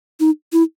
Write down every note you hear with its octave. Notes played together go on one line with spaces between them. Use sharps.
D#4
E4